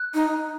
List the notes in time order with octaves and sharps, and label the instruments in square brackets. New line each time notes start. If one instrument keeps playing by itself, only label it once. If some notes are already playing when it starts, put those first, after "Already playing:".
Already playing: [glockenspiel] F#6
[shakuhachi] D#4